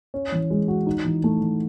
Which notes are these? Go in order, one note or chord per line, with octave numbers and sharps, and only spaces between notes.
C#4
E3
G#3
F#4
D#4
E3
A3
E3